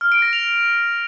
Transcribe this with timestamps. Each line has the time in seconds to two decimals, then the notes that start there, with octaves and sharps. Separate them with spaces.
0.01 F6
0.12 D7
0.22 A#6
0.33 F7